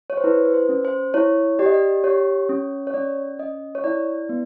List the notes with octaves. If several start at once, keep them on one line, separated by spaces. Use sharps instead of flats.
C#5
C5
E4 B4
B4
C5
C#4
C5
E4 C#5
G4 D5
D#5
D5
G4 C#5
C#4
C#5
C#4 D5
C#4 D#5
C#5
E4 D5
B3